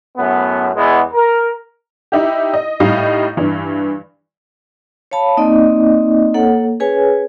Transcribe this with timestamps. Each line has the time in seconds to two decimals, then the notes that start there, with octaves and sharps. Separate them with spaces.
0.18 F#2 A2 B3
0.76 E2 E3 G#3 B3
1.14 A#4
2.12 D#4 E4 G4
2.54 D#5
2.80 A2 G3 D#4 D#5 F5
3.37 G2 E3
5.11 C#5 F5 A5 B5
5.37 A#3 C4 D#4 D5 D#5
6.34 A#3 A4 C#5 F#5
6.80 C#4 G#4 B4 C#5 G#5